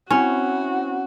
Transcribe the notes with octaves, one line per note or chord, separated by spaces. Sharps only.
C4 C#4 E4 F#4